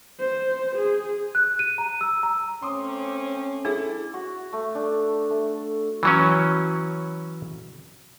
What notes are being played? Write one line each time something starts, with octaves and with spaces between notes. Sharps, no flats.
C5
G#4
F#6
D#7
A#5
E6
A#5
A3 C4 C#4 C6 D6 D#6
D4 E4 G#4 A4
F#4
A3
D4
A3
E3 F#3 C#4